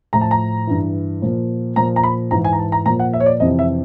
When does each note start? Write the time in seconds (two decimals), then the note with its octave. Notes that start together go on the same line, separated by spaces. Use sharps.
0.13 A2 F3 A#5
0.21 A5
0.31 A#5
0.67 G2 E3
1.22 A#2 F3
1.76 A#2 F3 A#5
1.96 A#5
2.04 B5
2.31 G#2 E3 A#5
2.44 G#5
2.53 A#5
2.59 A5
2.72 A#5
2.86 A#2 F3 A#5
2.99 F#5
3.13 E5
3.20 C#5
3.26 D5
3.40 F2 C3 E3 D#5
3.59 E5